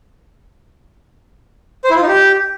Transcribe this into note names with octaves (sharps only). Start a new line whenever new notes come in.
C5
E4
F4
D#4
G4